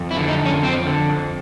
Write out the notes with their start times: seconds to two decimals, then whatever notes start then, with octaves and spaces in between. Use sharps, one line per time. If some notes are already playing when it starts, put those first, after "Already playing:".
Already playing: F2
0.11 E4
0.17 D3
0.28 D#4
0.39 F2
0.46 C#4
0.63 F2 C4
0.85 D3
1.09 F2